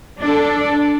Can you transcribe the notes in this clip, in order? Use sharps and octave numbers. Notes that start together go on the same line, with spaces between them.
D4 A4